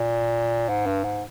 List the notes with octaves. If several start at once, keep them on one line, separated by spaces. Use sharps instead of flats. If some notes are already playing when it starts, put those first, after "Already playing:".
Already playing: A#2
G#2
G2
G#2